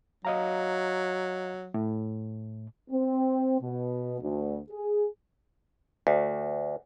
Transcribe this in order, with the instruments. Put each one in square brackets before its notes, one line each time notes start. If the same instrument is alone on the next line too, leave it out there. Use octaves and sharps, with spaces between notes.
[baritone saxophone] F#3 [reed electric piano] D#5 F5 A#5
[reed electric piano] A2
[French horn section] C4
B2
D2
G#4
[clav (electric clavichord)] D2